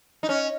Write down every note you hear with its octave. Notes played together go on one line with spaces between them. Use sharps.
D#4
C#4